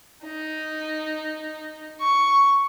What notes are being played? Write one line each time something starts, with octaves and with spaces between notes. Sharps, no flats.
D#4
C#6